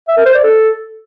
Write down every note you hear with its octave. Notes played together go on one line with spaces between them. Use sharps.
E5
A#4
C5
D5
A4